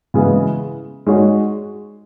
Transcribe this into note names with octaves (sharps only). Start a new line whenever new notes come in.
C#3 E3 G#3 B3
G#3 D#4 F#4 C#5